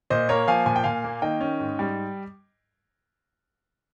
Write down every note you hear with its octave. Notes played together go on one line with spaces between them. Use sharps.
A#2 C5 D#5
A#3 A#4 C#5
F3 F5 G#5
A#2 G#5
G5
A#2 F5 G#5
A#3
D#3 D#5 G5
C#4
G#2
G3